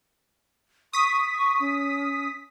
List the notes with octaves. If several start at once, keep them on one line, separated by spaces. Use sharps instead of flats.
C#6 D#6 B6
C#4